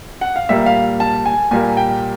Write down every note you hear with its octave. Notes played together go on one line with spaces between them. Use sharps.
F#5
F5
A#2 G3 A#3 E5
F5
A5
G#5
A#2 G3 A#3 G#5
G5